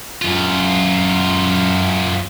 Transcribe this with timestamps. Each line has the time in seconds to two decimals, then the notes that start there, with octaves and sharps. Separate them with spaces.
0.22 F#2 F4